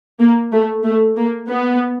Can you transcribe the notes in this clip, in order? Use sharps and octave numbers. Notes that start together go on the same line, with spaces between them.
A#3
A3
A3
A#3
B3